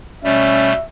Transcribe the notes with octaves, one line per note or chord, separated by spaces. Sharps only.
B2 G3 A3 C#4 E5